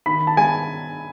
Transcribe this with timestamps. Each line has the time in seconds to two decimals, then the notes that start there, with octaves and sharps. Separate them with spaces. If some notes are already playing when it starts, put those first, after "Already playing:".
0.06 D#3 B5
0.27 A5
0.37 G#3 G#5